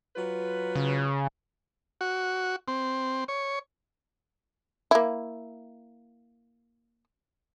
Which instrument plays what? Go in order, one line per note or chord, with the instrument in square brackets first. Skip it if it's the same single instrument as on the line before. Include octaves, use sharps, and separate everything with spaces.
[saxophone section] F#3 F4 B4
[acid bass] C#3
[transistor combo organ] F#4
C4
C#5
[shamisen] A#3 E4